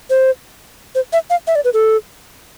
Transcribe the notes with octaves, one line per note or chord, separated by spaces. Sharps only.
C5
C5
E5
F5
E5
D5
B4
A4